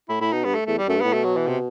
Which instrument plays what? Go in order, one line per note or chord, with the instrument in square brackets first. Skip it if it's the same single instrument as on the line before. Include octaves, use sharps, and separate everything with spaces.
[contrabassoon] A2 [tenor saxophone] E4
[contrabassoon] A2 [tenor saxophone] E4
[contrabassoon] B2 [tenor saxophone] D#4
[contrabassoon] G2 [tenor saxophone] B3
[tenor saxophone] A3
[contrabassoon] E2 [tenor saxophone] A3
[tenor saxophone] G3
[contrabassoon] F#2 [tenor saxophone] A3
[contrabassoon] G2
[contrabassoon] A2 [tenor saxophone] B3
[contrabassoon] B2 [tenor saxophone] A3
[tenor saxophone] F#3
E3
C3